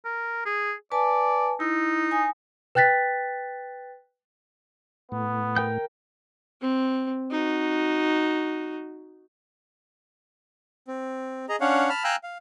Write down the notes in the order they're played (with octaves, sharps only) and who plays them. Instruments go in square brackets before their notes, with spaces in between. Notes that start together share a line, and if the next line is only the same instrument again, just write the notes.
[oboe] A#4
G#4
[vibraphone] B4 G#5 A5 [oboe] D5
[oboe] D#4 [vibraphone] E4
[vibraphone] G#5 D#6
[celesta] B4 G5 F#6 A6 B6
[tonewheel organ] A2 [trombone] B3
[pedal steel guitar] A#4 G5 G6
[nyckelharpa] C4
D#4 F#4
[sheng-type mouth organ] C4
G#4 D#5 A#5
C#4 D4 C#5 F5 F#5
A5 B5 F6
F5 G5 G#5 A#5 E6 F#6
F5